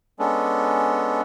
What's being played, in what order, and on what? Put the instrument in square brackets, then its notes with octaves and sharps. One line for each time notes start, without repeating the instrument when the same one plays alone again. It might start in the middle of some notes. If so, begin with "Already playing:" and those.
[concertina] G#3 B3 C#4 D4 A4